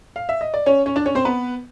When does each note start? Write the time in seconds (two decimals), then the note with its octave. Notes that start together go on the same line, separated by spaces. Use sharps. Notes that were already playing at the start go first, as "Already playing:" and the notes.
0.16 F5
0.29 E5
0.41 D#5
0.54 D5
0.66 C#4 C#5
0.86 C#4 C#5
0.96 D4 D5
1.06 C#4 C#5
1.15 C4 C5
1.25 B3 B4